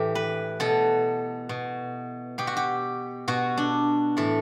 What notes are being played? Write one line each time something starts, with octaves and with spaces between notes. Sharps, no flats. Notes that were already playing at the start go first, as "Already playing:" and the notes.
Already playing: A2 E3 G4
B4
B2 A4
B2
B2 G4
F#4
G4
B2 F#4
D4
A2 E3 A4